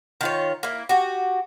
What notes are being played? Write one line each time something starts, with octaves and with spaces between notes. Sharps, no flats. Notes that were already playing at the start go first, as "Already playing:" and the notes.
D#3 F4 C#5
A#3 E4
F#4 G4